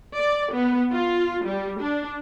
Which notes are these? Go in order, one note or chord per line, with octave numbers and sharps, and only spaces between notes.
D5
B3
F4
G3
D4